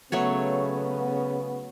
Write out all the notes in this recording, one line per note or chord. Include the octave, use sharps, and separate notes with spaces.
C#3 F#3 A3 B3 C#5